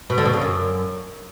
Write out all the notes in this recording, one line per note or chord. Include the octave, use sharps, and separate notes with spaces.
B2
D3
B2
C#3
F#2